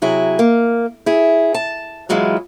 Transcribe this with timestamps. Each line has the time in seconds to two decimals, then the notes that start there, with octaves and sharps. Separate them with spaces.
0.02 C3 F#3 E4 G#4
0.39 A#3
1.06 E4 G#4
1.54 A5
2.09 E3 F#3 G#3 E4 F4